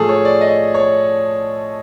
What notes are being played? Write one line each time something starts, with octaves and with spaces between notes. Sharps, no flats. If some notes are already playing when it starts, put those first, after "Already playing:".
Already playing: A2 F3 A3 G#4 A4
C#5
D5
D#5
C#5